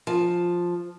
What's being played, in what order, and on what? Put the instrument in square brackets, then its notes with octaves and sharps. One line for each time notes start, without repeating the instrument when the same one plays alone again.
[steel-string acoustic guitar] F3